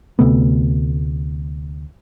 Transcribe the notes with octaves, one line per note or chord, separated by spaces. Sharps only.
D2 C3 A3 B3